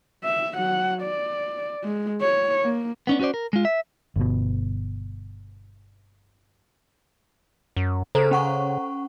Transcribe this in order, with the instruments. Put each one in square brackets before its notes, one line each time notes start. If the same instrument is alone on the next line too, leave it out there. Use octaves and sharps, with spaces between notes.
[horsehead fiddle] E5
F#3 F#5
D5
G#3
C#5
A#3
[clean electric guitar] B3 C#4 D4
C#4 F#4 A4 C5 D5
A#4
G#3 F4
E5
[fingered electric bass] G1 B2
[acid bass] F#2
[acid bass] C#3 [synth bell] A4 C5 A#5
[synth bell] C#4 F#5 C#6